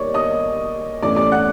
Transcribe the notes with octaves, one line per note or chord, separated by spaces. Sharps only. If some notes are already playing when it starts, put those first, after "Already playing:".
Already playing: D#3 G3 A#3 D#4 C#5 D5 C#6
D#5 D#6
A2 E3 A3 C#4 D5 D6
D5 D6
F#5 F#6